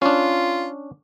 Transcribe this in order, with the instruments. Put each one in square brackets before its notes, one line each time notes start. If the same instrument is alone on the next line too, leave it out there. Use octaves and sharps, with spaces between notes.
[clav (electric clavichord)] C#4 D4 [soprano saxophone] F4